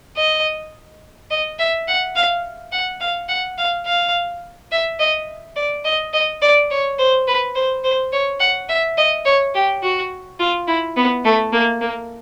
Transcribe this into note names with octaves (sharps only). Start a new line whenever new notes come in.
D#5
D#5
E5
F#5
F5
F#5
F5
F#5
F5
F5
E5
D#5
D5
D#5
D#5
D5
C#5
C5
B4
C5
C5
C#5
F#5
E5
D#5
C#5
G4
F#4
F4
E4
B3
A3
A#3
A#3